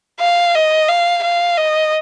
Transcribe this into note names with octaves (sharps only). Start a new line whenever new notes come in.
F5
D#5
F5
F5
D#5